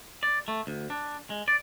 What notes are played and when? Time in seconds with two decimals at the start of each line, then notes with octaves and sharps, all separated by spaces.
0.23 D5
0.48 A3
0.67 D2
0.90 D4
1.30 G#3
1.48 D5